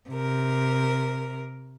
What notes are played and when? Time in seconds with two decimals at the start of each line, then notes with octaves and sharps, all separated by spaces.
0.10 C3 A#4